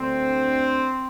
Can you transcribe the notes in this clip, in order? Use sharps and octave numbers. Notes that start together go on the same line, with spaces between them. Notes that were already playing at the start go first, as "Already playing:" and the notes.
Already playing: D2 D3 C4